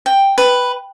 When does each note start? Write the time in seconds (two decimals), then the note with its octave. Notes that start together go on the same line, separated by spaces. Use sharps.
0.06 G5
0.38 B4